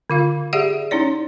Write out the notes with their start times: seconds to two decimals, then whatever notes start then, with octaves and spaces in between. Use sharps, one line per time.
0.10 D3 F4 F5
0.53 G4 G#4 D5 E5 F#5
0.91 C#4 D#4 E4 C#5 D5